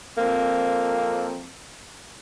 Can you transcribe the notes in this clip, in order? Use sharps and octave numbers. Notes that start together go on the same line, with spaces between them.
F2 A#3 C4